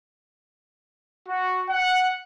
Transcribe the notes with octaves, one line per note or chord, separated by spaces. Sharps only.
F#4
F#5